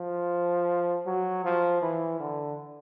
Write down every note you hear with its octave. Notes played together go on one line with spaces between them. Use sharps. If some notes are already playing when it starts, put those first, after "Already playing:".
Already playing: F3
F#3
F3
E3
D3